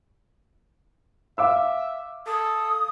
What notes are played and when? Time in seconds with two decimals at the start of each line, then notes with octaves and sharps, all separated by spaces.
1.38 E5 F5 D6 E6
2.27 A4 D#6